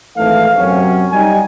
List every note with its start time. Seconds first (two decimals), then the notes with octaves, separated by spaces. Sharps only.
0.16 G#1 E3 A3 F5
0.56 F#2 C3 F#3 C#4
1.12 G3 D#4 G#5